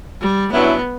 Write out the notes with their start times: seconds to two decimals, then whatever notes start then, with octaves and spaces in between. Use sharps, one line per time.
0.21 G3
0.52 G2 F#3 B3 C#4 E4